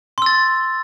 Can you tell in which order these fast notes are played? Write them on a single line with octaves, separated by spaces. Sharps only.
C6 E6 A6